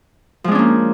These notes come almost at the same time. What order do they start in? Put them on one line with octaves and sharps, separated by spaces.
F3 G#3 D4 C#4 A#3